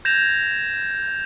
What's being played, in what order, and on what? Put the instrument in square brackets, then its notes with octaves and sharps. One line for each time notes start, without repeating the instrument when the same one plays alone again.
[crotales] G6 G#6 A#6 E7 F7